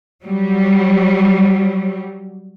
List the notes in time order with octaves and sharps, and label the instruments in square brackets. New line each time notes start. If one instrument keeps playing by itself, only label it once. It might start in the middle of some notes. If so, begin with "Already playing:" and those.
[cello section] F#3 G3